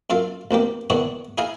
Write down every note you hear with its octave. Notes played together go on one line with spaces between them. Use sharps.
F#2 F4 A4 F5
A1 B2 A#3 G4
D#3 B3 D4 E4 G#4 C#5
D#4 E4 G#4 F5 G#5 A#5